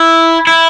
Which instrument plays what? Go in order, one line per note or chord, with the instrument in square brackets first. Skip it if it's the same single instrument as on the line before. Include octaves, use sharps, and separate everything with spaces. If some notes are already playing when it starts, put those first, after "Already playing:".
Already playing: [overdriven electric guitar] E4
E4